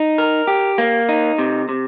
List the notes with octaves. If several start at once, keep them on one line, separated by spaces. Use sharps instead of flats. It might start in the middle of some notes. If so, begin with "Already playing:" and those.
Already playing: D#4
A#4
G4
A#3
D#4
C3
C3